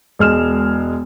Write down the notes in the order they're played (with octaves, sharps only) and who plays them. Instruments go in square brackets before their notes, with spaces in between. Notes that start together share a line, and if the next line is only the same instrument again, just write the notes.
[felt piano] E1 G#3 F6 E7